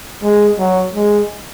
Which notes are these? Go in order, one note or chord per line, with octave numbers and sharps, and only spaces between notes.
G#3
F#3
G#3